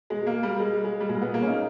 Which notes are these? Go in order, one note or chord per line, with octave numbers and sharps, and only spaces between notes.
B2 G#3
A#3
G3
G#3
G#3
G3
A#2 G#3
B3
A#3
C#4
D#4